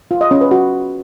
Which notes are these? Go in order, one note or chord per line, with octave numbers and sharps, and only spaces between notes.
F4
D#5
C#4
B4
F#4